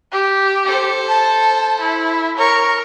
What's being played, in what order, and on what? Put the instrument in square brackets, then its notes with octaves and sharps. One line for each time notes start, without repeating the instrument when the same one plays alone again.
[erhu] G4
[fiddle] A4 C5
[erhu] A5
E4
[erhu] A#4 [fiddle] C#5 C#6